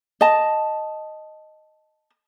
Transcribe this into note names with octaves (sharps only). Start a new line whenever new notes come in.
D#5 A5